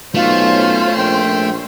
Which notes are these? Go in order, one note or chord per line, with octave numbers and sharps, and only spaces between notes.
B1 A3 C#4 F4 C5
A#1 G5